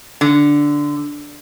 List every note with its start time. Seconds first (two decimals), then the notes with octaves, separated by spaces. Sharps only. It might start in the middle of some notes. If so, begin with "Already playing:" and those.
0.21 D3